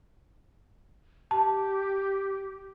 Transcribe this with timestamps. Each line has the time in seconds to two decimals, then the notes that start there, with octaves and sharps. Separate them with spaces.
1.31 G4 A5